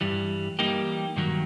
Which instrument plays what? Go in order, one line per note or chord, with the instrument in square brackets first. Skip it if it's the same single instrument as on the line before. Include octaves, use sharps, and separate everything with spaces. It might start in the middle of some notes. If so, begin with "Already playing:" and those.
[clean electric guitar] G2 E3 G3
E3 G3 A#3 D#4 G4
G2 D#3 F#3 A#3